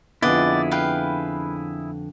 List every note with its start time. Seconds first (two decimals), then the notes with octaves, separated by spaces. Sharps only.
0.22 F2 D3 B3 E4 G#4 D5 D#5 F#5
0.71 B4 F5 G5